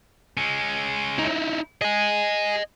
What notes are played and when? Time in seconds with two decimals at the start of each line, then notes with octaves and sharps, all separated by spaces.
0.37 G#3 C#4
1.19 D#4 E4
1.82 G#4 D#5 G#5